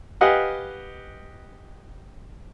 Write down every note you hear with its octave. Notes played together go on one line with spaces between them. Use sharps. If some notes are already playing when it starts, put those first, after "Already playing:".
G4 B4 D#5 F5 F#5 G#5